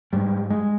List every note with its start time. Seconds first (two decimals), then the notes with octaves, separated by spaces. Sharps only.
0.13 G#2 G3
0.50 G#3